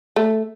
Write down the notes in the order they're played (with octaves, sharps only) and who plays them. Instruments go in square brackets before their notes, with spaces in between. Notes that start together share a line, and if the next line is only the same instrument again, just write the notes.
[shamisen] A3